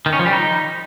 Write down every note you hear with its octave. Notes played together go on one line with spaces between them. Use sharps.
D#3
C#4
F3
G3
D#4